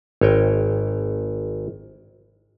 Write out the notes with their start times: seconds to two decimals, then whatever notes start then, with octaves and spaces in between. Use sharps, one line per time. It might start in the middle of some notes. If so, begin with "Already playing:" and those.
0.21 G#1 C#5 D#5 G5